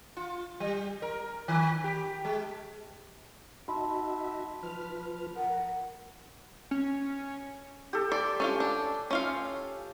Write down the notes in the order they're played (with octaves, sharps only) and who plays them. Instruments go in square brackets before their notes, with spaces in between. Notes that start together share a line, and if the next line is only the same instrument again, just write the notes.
[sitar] F4
G3
A#4
D#3
G4
G#3
[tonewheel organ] D#4 F#4 E5 [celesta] A5 B5 C6
[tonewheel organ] F3 B4 F6
[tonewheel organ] A#4 [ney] F#5
[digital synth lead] C#4
[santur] G4 A4
[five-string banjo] D5 [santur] C6
[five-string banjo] C#4 D4 F4
D4
C#4 F4 F5